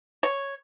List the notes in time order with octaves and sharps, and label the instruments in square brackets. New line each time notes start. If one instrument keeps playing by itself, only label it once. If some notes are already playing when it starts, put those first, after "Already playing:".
[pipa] C#5